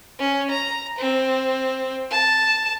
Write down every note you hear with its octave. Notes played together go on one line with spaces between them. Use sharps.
C#4
A#5
C4
A5